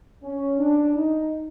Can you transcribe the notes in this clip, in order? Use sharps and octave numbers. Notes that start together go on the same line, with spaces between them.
C#4
D4
D#4